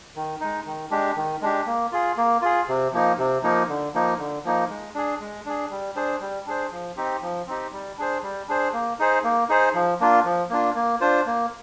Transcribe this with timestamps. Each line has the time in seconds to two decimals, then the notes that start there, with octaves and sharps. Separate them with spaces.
0.15 D#3
0.40 G#3 D#4
0.66 D#3
0.91 G#3 D4 G4
1.16 D#3
1.41 G#3 D4 G4
1.66 A#3
1.92 F4 G#4
2.17 A#3
2.42 F4 G#4
2.68 C3
2.93 F3 A#3 D#4
3.18 C3
3.43 F3 A#3 D#4
3.69 D3
3.94 F3 A#3 D#4
4.19 D3
4.44 F3 A#3 D#4
4.70 G#3
4.95 D4 G#4
5.20 G#3
5.46 D4 G#4
5.71 G3
5.96 D4 G#4 C5
6.21 G3
6.46 D4 G#4 C5
6.71 F3
6.96 C4 D#4 G4
7.22 F3
7.47 C4 D#4 G4
7.72 G3
7.98 D4 G#4 C5
8.23 G3
8.48 D4 G#4 C5
8.73 A#3
8.99 D#4 G#4 C5
9.24 A#3
9.49 D#4 G#4 C5
9.74 F3
10.00 A#3 D4 F4
10.25 F3
10.50 A#3 D4 F4
10.75 A#3
11.01 D4 F4 C5
11.26 A#3